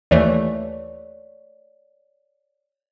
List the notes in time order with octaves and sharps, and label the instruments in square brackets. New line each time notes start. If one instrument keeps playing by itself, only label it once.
[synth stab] D#2 E3 A3 [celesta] C#5 D5